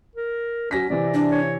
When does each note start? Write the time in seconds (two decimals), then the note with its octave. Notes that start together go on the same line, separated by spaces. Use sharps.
0.16 A#4
0.71 F#3 C#4 A#6 B6
0.90 C3 E3 D5
1.14 D4
1.32 C#5